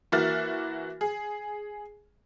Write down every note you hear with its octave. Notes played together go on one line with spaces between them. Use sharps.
E3 A#3 F#4 E5 F6 A6
G#4